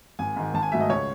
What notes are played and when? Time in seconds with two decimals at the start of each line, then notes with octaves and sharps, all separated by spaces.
0.19 G#1 G#5
0.36 G#2 D#3
0.54 G#1 A5
0.62 G#5
0.72 G#2 F#3 A3 E5
0.80 D#5
0.89 C#2 C#5